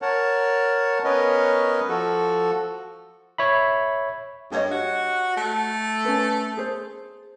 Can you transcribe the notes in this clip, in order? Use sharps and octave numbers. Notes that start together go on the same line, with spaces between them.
A#4 C#5 F#5 A5
B3 C#4 A#4 B4 C#5 D#5
F3 F#4 A4
C#5 E5 B5
G2 G4 C#5 D#5
F#4
A3
C#4 B4
G#4 C5